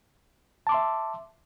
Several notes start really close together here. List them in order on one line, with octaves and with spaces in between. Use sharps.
A5 D6 C6 E5